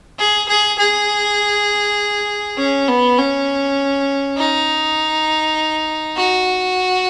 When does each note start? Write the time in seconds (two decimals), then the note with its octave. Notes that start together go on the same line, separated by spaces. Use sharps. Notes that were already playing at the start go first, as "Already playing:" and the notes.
0.19 G#4
0.49 G#4
0.79 G#4
2.58 C#4
2.88 B3
3.18 C#4
4.37 D#4
6.17 F#4